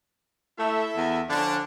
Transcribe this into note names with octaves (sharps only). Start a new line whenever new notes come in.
A3 E4 A4 E5
E2
D3 F3 C#4 D4